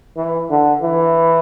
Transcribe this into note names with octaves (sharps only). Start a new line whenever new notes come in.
E3
D3
E3